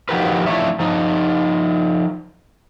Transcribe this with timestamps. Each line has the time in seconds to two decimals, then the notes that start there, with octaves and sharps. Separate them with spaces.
0.09 F3 D#4 F#4 G4 A#4 B4
0.46 F3 A3 D4 E4 C#5 E5
0.80 F3 D#4